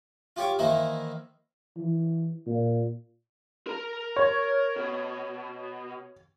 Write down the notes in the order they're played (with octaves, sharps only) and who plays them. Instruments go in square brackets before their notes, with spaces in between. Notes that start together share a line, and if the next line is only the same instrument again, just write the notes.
[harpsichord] F4 G4 C#5 D6
D#3 E3 A#3 E4 C5
[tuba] E3
A#2
[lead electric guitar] A#4 A#5
[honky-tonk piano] C#5
[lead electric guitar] B2